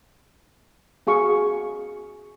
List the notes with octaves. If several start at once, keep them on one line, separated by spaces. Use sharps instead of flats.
F#4 G#4 F5 C#6